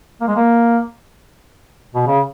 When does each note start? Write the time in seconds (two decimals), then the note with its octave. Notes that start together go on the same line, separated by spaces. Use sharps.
0.21 A#3
0.28 G#3
0.36 A#3
1.95 B2
2.07 C#3